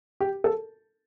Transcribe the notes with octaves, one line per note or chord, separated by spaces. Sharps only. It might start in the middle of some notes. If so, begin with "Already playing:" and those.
G4
A4